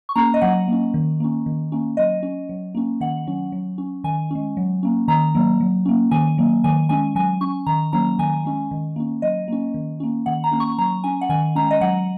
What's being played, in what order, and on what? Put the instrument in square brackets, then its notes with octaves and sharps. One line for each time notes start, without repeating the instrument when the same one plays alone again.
[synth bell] C#6
A#3 C#4 A#5
D#5
F#3 F#5
A#3 C#4
D#3
A#3 C#4
D#3
A#3 C#4
F#3 D#5
C#4
F#3
A#3 C#4
D#3 F#5
F#3 C#4
F#3
C#4
D#3 G#5
G#3 C#4
F#3
A#3 C#4
D#3 A#5
F#3 A#3
F#3
A#3 C#4
D#3 G#5
F#3 A#3
D#3 G#5
G#3 C#4 G#5
F#3 G#5
C#4 C#6
D#3 A#5
F#3 A#3 C#4 A#5
D#3 G#5
G#3 C#4
D#3
A#3 C#4
F#3 D#5
A#3 C#4
D#3
A#3 C#4
D#3 F#5
A#5
A#3 C#4
C#6
F#3 A#5
C#4 G#5
F#5
D#3 G#5
G#3 C#4 A#5
D#5
F#3 F#5